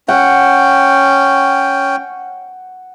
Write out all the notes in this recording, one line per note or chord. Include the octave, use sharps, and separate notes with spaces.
C#4 F#5 G5